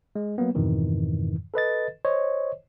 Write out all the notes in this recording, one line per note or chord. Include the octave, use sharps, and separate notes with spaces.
G#3
F#3 A#3 B3
F2 G#2 B2 D#3 E3
A4 B4 D#5 A6
C5 C#5 D#5